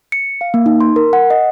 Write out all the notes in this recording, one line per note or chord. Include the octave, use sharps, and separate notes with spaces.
C#7
F5
A#3
D#4
C6
A#4
F#5
D#5